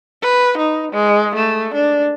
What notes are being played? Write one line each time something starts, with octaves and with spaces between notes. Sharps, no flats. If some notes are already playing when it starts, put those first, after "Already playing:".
B4
D#4
G#3
A3
D4